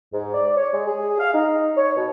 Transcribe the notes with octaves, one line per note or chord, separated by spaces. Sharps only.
G#2
D5
C#5
G#3
G#4
F5
D#4
C#5
B2